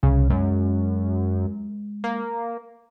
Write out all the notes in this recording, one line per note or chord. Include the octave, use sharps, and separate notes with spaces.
C2 C#3
F#2 G#3
A#3